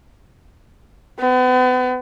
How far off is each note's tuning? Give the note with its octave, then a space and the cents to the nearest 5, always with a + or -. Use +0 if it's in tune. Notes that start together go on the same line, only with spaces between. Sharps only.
B3 +40